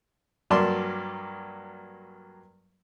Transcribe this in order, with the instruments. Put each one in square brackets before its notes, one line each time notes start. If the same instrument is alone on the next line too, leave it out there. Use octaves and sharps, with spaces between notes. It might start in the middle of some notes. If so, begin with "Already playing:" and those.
[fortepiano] G2 F#3 A#3 D5 A5 C6